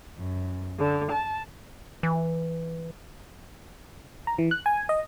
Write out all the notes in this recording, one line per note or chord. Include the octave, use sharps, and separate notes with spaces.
F#2
D3
A5
E3
A#5
E3
F#6
G#5
D#5